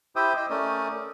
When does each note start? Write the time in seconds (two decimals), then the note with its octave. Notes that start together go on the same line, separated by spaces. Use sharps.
0.16 E4 G4 C5 E5 G5 D#6
0.37 C5 D#5 G5
0.50 A3 C#4 A#4 D5 D#6